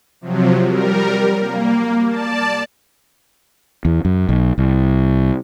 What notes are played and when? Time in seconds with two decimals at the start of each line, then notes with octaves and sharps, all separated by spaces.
0.21 C3 F3 F#3
0.65 G3 A#4
1.39 A#3
2.08 D5 A5
3.85 E2
4.05 F#2
4.29 B1
4.58 C2